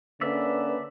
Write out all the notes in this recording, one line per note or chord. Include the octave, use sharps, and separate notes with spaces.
D3 A#3 C#4 B4 D5 E5